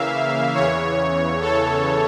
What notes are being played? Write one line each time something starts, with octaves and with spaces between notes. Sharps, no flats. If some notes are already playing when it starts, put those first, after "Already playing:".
Already playing: C#3 E3 A#3 E5 F5
E2 C#3 E3 C#5
A4